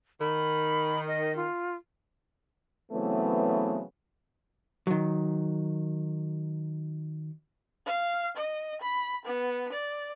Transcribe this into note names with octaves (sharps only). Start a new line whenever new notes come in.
D#3 B5
D#5
F4
C#3 E3 F#3 A3 B3 C4
D#3 F#3
F5
D#5
B5
B3
D5